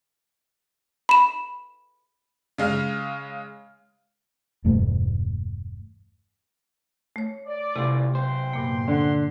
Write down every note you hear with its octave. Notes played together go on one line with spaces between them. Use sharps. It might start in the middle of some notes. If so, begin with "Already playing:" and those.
B5 E7
C#3 G#3 F5 F6
E1 G2 G3 A3
A3 C#5
D5
A2 C3 G3 F4
B1 C5 G5 C6
G2 A#2 A#3
D3 F#5 C6